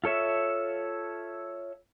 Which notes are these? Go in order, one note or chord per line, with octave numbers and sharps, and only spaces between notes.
F4 A4 C#5 E5